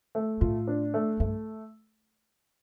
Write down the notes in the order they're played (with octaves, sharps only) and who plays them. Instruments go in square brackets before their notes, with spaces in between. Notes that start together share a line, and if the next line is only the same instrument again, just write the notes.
[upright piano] A3
[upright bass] A2 [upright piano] F4
[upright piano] D4
A3
[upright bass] G2 [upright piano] A3